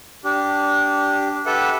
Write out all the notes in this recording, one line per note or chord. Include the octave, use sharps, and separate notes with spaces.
D4 G4
G4 A4 B4 E5 F#5